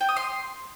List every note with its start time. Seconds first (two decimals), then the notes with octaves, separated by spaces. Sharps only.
0.01 G5
0.09 D#6
0.17 C6